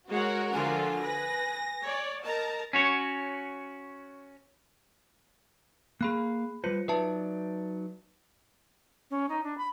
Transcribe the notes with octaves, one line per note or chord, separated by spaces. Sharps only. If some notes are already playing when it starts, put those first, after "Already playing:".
G#3 F#4 A#4 C#5 F#5
D3 F3 F4 G#5
B4 A#6
C#5 D5
A#4 D#5 A5 A#5
C#4 F#4 C#5
A#3 G#4 F5 B5 F#6
G3 F4 B4 C5 C#7
F#3 D#4 B4 D5 E5 A5
C#4
D#4
D4
B5